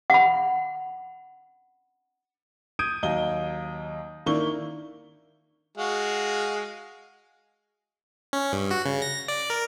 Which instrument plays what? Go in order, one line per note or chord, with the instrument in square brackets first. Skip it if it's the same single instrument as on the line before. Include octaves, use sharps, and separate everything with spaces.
[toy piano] F#5 B5
[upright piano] D#6 G6 G#6 D7 D#7
D#2 F#3 D#5 G7
D#3 A#3 D4 E4 C#6 G7
[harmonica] G#3 F#4 F5
[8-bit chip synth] C#4
G2
F#4
C#3
A#6
D5
A#4